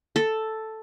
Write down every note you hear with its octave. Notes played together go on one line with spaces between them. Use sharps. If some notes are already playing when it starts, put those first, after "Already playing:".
A4